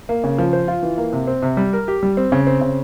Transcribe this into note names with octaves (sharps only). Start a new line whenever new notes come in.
A#3
C#3
F3
C5
F4
E3
A#3
C3
C4
C3
G3
A#4
G4
G3
C4
C#3
C4
C#3